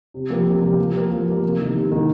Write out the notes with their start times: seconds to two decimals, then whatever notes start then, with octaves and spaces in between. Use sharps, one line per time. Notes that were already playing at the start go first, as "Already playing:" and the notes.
0.14 C3
0.30 F3 A#3 G4 A#4
0.47 C3
0.63 F3 A#3 G4 A#4
0.79 F3
0.94 A#3 G4 A#4
1.11 F3
1.27 A#3 G4 A#4
1.43 C3
1.59 D#3 A#3
1.75 C3
1.92 D#3 A#3